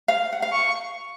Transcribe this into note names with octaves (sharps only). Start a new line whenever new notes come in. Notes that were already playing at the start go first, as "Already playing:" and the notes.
F5
F#5
F5
C#6